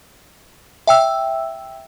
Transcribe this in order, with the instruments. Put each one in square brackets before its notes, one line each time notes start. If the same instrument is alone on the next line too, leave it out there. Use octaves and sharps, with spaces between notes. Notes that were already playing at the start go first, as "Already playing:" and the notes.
[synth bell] E5 G5 E6